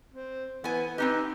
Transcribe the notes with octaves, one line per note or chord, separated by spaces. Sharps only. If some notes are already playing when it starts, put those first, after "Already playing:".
C4
E3 B3 G#5
C4 D#4 G4 B4